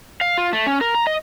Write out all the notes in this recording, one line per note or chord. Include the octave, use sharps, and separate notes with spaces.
F5
F4
A3
C#4
A#4
A#5
D#5